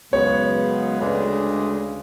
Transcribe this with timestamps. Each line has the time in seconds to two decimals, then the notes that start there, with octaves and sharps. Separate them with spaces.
0.12 F#2 C#3 G#3 B3 C#5
0.99 D2 C#3 G#3 D4 B4